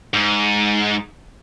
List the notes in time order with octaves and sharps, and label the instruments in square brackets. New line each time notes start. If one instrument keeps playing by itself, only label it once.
[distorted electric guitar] G#2